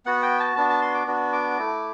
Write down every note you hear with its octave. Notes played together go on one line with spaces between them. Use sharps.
B3 F#4 F#5
G5
A5
B3 D4 F#4 A5
A5
C6
D6
B3 D4 F#4
D6
A3 E4